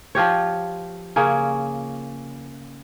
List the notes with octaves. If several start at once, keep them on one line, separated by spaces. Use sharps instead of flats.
F3 F4 G4 C#5
C#3 A#3 C#4